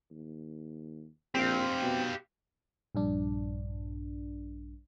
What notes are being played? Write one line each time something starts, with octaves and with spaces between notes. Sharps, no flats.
D#2
A#1 C4 G4 F5
B2
A#1 G2 D4